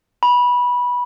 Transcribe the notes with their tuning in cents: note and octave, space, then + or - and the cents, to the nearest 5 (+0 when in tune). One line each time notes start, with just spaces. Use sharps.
B5 -15